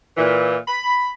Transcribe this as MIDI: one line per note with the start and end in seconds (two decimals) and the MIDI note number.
0.17 0.56 46
0.17 0.56 52
0.68 1.10 83